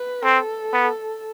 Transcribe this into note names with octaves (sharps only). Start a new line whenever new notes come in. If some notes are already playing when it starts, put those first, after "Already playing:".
Already playing: B4
C4 A4
B3